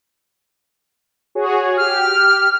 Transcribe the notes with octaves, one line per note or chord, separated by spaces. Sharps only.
F#4 G#4 C#5
G4 F6